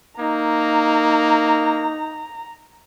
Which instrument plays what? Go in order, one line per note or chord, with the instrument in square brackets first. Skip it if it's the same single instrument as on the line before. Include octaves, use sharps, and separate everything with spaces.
[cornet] A#3 [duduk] D#4 [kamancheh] A#5